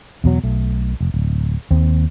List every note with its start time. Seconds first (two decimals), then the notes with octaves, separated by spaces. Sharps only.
0.24 E2 B2 F#3
0.43 B1 A3
1.01 F1
1.14 D1
1.71 D#2 C4